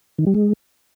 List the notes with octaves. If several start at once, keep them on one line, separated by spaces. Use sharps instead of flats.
D#3
G3
G#3